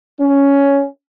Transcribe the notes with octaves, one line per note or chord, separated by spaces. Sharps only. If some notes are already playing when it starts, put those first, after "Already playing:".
C#4